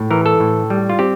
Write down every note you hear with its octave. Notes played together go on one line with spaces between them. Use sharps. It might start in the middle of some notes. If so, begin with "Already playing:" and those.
Already playing: A2
E3 A#4
A4
A2
G3
F4
C4 G4